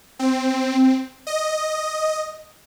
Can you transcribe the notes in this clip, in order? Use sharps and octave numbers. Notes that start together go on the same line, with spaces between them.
C4
D#5